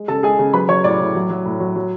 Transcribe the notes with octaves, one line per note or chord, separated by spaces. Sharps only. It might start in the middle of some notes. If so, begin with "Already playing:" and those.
Already playing: G#3
C#3 A4 A5
G#3 G#4 G#5
C#3
F#3 B4 B5
F#3 C#5 C#6
A2 D5 D6
A2
F#3
F#3
A2
F#3
F#3